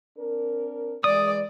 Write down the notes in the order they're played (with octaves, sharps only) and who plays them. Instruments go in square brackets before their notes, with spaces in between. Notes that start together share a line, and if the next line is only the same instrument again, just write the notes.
[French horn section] C4 D4 A#4
[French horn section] E3 G#3 [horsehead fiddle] D5 [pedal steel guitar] D#6